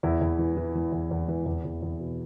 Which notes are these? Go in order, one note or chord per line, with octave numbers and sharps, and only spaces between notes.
E2 E4
E2
E3
E3
E3
E2
E2
E3
E2
E2
E2
B2